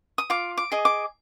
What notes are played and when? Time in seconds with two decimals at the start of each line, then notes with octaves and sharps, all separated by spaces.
0.18 D#6
0.30 F4 D6
0.57 D6
0.72 G#4 D#5
0.85 D6